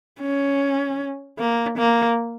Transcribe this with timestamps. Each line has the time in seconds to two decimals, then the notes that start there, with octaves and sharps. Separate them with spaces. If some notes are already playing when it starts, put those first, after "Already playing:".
0.21 C#4
1.39 A#3
1.78 A#3